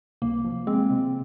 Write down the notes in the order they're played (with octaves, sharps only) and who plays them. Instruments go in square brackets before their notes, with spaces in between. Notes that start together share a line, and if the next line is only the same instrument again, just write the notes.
[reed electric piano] C2 [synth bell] A#3
[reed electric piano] F3
[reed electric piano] G#3 [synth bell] C4
[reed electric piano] C3